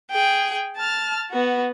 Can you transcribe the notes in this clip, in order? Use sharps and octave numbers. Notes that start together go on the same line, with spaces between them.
G#4 G5
A5 F6
B3 F#4